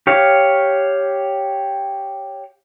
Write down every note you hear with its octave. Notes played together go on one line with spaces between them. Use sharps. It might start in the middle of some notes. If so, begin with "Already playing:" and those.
G4 C#5 F5